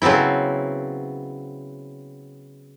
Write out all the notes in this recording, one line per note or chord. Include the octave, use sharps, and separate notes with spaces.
C#3 F#3 B3 C4 E4